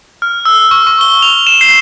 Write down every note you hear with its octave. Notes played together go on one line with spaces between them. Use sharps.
F6
E6
C#6
C#6
G7
F7
E7
C7